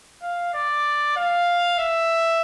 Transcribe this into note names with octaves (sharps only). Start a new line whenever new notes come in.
F5
D5
F5
E5